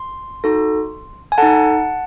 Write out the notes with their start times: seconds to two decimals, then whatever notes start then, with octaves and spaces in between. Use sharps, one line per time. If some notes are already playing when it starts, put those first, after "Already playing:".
Already playing: C6
0.44 D#4 F#4 A4
1.32 G#5
1.38 D#4 A4 F#5 A5